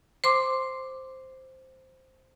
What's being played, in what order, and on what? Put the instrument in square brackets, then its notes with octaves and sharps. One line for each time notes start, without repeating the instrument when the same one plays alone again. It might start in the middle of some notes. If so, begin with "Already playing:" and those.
[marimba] C5 C6 D6